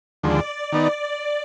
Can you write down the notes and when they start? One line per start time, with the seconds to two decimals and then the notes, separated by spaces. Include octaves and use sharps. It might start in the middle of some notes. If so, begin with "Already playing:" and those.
0.23 D#2 D3 F3 G#3 D5
0.72 D#3 B3 D#4